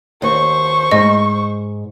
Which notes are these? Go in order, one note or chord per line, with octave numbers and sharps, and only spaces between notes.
D#2 C5 C#6
G#2 D#5